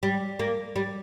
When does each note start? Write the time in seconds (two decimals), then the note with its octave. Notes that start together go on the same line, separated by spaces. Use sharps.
0.03 G3
0.39 A#3
0.76 G3